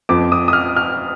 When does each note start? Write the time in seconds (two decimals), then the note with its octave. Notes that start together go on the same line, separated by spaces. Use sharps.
0.09 F2 F3 D6
0.32 D#6
0.48 D#6
0.53 F6
0.76 F6